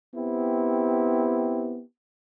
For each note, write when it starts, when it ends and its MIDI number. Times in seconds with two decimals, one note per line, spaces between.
0.14 1.81 59
0.14 1.81 60
0.14 1.81 64
0.14 1.81 67